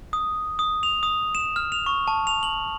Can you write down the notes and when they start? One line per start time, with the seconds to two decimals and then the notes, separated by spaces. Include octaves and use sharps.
0.13 D#6
0.59 D#6
0.83 F7
1.03 D#6
1.35 E7
1.56 F6
1.72 F7
1.86 C#6
2.08 A5
2.27 F7
2.43 F#7